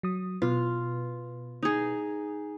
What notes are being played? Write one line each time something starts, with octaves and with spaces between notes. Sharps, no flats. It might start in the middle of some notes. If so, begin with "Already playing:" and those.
F#3 D#6
B2 F4 B4
D#4 G#4